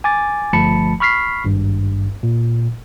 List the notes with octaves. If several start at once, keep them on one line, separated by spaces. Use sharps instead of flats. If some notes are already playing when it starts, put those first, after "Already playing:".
G#5 D6 A6
G1 F3 A3 A5 B5 C#7
B5 C#6 F6 B6 C7
G#1 G2
A#2